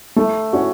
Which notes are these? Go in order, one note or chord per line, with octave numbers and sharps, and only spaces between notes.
A3
C#4 F#4